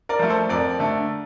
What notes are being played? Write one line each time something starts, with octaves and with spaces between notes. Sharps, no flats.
A#4 D5
F3 A3
A4 C5
F2 A#4 D5
D3 A3